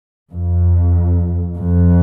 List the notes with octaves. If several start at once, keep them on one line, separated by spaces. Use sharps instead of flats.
F2
F2